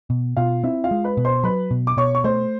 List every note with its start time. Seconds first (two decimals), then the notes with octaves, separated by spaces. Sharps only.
0.10 B2
0.37 B2 F4 F5
0.64 C4 E4 E5
0.84 F4 F5
0.91 G#3
1.04 B4 B5
1.17 B2
1.25 C5 C6
1.44 F#3 B4 B5
1.71 B2
1.87 D6
1.97 B2 C#5 C#6
2.15 C#6
2.24 A3 C5 C6